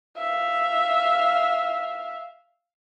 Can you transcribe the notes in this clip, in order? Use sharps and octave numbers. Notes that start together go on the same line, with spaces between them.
E5 F5